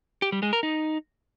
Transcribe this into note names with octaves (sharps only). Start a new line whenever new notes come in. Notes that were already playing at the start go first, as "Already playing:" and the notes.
G4
G3
G#3
A#4
D#4